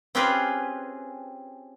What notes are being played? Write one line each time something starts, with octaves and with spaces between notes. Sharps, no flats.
C4 C#4 F4 G4 G#4 B4